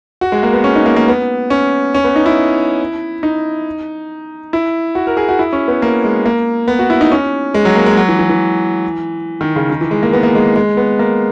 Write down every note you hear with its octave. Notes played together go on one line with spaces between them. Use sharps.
F#4
G#3
A#3
B3
C#4
D#4
A#3
A#3
B3
C#4
C#4
B3
D#4
E4
D#4
E4
F#4
A#4
G#4
F#4
E4
C#4
B3
A#3
G#3
A#3
B3
F#4
E4
D#4
C#4
G#3
F#3
A#3
G#3
F#3
E3
E3
E3
D#3
C#3
D#3
E3
G#3
A#3
B3
A#3
G#3
G#3
B3
A#3